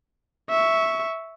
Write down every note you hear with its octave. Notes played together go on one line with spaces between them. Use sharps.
E5 C#6